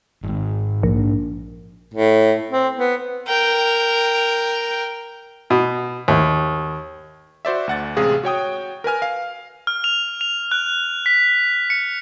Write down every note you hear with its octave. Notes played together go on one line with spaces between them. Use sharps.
G#1 G#2
A#1
A2
C4
B3
A#4 G5
B2
D#2
F#4 C5 D5 E5
D2 F#5 A6
A1 C3 G#3 G#4 F5 D#6
F#4 C#5 G5 D#6
A#4 B4 G#5 F6
F5
F6
F7
F7
F#6
B6
C#7